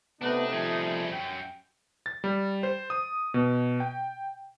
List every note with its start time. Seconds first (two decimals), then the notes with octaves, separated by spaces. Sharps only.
0.21 C3 A3 B3 D4 D#4
0.53 F3 G3 G#4
1.11 F#2 G5
2.06 A6
2.24 G3
2.63 C5
2.90 D#6
3.34 B2
3.80 G5